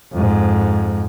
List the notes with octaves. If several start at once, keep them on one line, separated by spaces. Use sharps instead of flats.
F2 G#2